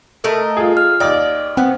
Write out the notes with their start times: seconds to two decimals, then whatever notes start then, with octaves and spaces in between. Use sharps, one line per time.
0.24 A3 A#4 D#5
0.57 F4 G#4
0.77 F6
1.00 D#2 D5 D#5 G5
1.57 B3 C4